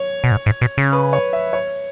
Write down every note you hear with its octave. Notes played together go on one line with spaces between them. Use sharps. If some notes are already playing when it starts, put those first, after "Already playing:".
Already playing: C#5
B2
G#2
G#2
B2
C#3
B4
C#5
E5
C#5